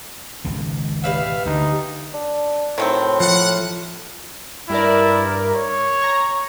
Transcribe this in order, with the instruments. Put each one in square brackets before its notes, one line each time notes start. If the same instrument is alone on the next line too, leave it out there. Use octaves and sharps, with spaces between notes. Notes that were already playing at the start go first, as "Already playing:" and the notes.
[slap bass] G#1 C#2 B2
[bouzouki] G3 B4 E5 [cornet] F5
[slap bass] D2 D3 [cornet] D#4
[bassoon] D4
[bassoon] A2 [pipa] D#3 F#3 C4
[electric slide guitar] F3 [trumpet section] F#5
[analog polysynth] G2 A#4 D5 [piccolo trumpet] E4
[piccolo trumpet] C#5
[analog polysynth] A#5 C#6